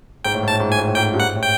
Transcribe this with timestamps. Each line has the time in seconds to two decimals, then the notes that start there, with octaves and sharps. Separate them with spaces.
0.24 G#2 G5
0.34 A2
0.43 G#2
0.48 A5
0.52 A2
0.60 G#2
0.69 A2 G#5
0.78 G#2
0.87 A2
0.95 G#2 G5
1.14 G2
1.19 G#2 F#5
1.35 A2
1.43 G5